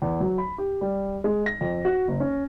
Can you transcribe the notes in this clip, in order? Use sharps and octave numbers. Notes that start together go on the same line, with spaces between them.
E2
F#3
B5
G4
G3
G#3
A#6
F2
F#4
F#1
C#4